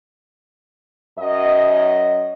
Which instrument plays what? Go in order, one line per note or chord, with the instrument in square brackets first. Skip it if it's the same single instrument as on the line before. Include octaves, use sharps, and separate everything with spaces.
[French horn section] F#2 D#5